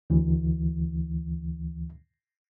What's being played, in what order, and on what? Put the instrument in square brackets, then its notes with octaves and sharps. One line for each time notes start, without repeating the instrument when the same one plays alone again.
[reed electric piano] D2 E3